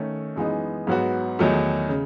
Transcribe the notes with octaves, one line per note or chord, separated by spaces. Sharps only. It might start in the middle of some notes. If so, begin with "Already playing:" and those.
Already playing: D#3 A3 C#4
F#2 E3 G#3 B3 D#4
G#2 F#3 B3 F#4
E2 D#3 F#3 A3 D#4
C#3